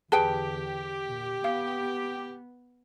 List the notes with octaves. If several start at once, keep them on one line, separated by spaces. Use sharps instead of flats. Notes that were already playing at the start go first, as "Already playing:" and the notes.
E2 D3 G4 G#4 B4 G5 A5
A#2
B3 F5